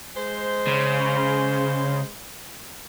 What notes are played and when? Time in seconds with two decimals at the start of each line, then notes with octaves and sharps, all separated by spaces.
0.16 G#3 C5
0.67 C#3